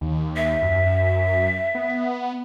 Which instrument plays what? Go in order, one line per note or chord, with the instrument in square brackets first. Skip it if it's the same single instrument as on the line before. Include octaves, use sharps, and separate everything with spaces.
[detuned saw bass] D#2
[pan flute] E5
[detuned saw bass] F#2
B3